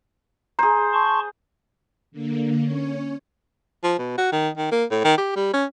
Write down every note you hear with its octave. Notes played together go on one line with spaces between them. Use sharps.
G#4 C5 A#5
A5 C6 C#6
D3 A#3
C#4 C#5
F3
B2
F#4
D#3
D#3
A#3
A2
D#3
G4
G3
C#4